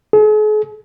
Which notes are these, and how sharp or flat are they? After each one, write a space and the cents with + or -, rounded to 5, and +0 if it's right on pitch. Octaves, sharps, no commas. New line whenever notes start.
G#4 +45